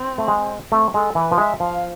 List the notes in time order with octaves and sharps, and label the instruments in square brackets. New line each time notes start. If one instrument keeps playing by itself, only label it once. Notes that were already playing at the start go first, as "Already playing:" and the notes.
Already playing: [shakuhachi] C4
[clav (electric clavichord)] A3
G#3
[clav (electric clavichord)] A3 [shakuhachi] C4
[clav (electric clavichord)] G#3 [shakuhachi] A4
[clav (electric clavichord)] E3 [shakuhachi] B4
[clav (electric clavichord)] F3
[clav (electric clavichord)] G#3 [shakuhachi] E5
[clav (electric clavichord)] F3 [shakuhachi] F5